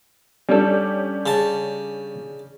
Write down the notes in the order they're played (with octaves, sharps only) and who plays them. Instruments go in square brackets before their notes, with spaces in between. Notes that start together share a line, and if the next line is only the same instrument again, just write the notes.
[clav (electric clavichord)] G3 A4 [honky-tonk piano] C#4 D4 G4
[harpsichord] C#3 A5